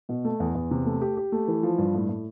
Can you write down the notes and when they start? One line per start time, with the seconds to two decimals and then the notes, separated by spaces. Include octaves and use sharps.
0.09 B2
0.25 A3
0.40 E2
0.55 E2
0.71 C3
0.85 A3
1.01 G4
1.17 G4
1.32 A3
1.48 E3
1.63 F3
1.78 G2
1.94 A2
2.09 A2